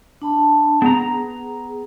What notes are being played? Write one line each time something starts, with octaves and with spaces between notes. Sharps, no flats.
D4 A5 B5
B3 G#4 A#5